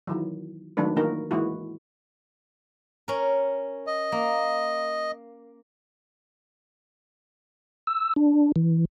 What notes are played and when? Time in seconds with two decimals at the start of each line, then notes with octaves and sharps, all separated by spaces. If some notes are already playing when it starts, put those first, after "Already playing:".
0.07 D#3 E3 F#3
0.77 D#3 F#3 G#3 A3 D4 B4
0.96 D#3 E3 A#3 D#4 F#4 A#4
1.31 E3 G#3 A#3 E4 F#4
3.08 C#4 A#4
3.87 D#5
4.12 A#3
7.87 E6
8.16 D4
8.56 E3